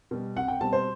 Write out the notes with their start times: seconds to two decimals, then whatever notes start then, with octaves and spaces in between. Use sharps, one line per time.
0.11 B2 G3
0.36 C2 F#5
0.48 G5
0.61 B2 G3 C4 A5
0.73 C5